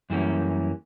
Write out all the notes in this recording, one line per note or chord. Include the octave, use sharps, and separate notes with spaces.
F#2 E3 G3 A#3 C#4